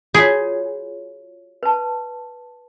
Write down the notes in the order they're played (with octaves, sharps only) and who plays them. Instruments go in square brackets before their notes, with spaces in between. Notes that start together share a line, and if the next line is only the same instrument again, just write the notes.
[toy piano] F4 F#4 C#5 [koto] G#4
[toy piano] B4 A5